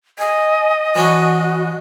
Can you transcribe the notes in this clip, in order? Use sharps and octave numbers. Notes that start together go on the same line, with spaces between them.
D#5 G#5
E3 C#4 D4 F#4